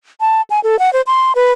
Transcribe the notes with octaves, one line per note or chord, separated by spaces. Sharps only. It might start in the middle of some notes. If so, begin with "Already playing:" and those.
A5
G#5
A4
F#5
C5
C6
B4